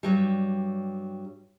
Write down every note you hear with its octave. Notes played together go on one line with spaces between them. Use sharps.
G2 F#3 G3